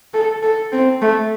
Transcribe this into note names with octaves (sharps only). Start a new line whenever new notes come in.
A4
A4
C4
A3